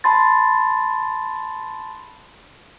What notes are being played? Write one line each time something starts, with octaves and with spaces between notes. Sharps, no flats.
A5 B5 C6 A6